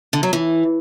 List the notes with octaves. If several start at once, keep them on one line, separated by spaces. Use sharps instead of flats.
D3
F#3
E3